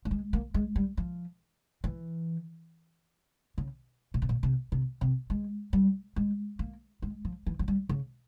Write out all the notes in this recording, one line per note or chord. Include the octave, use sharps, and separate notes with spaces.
A#3
G#3
A#3
G#3
G3
F3
E3
C#3
A#2
C3
A#2
C3
C3
C3
G#3
G3
G#3
A#3
G#3
F3
E3
F3
G3
C#3